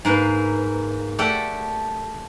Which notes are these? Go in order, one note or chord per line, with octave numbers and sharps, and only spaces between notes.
G#2 A#3 B4
A3 G4 A4 D5 F#5